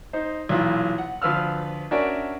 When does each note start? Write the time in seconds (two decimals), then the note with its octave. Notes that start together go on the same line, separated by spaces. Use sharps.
0.13 D#4 C5
0.49 B1 A#2 E3 F4
0.98 F#5
1.22 D2 F3 B4 F5 E6 F6
1.91 C#4 D4 F#4 A#4 D5 E5